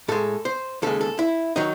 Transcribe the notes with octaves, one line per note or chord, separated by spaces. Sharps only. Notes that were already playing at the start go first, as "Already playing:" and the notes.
A2 G#3 A4
C5
D#2 C#3 G#3 A4
A4
E4
D#3 F#3 D#4